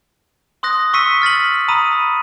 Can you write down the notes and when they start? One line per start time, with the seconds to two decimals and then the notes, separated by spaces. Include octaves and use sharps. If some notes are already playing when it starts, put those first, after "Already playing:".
0.63 C6 D#6 F#6 A#6
0.94 C#6 E6 B6 C#7 D#7
1.22 F6 A6 B6 F#7
1.68 A#5 B5 D#6 D#7